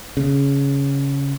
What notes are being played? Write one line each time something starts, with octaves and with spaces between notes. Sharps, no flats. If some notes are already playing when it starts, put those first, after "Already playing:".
C#3